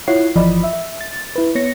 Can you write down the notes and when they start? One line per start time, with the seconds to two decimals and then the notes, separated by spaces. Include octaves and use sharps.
0.08 E4 F4 C#5 F#5 C7
0.36 G1 E3 F3 D5 D#5 B5
0.64 E5
1.01 A6
1.36 E4 B4
1.55 B3 C#5 A#6 C#7